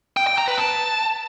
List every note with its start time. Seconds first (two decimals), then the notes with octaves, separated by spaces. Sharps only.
0.17 G5
0.27 G5
0.38 A#5
0.48 B4
0.58 A5